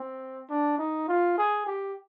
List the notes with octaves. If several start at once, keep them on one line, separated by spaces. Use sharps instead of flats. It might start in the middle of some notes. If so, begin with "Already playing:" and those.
Already playing: C4
D4
D#4
F4
G#4
G4